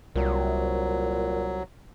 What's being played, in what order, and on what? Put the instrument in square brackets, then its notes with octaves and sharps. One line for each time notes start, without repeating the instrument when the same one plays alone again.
[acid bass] C2 [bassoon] A#2 [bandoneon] F#3